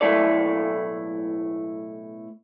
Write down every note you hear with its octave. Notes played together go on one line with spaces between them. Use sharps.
B1 A2 A3 E4 A4 D5